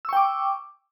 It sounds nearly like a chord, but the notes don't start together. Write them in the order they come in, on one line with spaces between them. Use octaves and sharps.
E6 C#6 G5 D6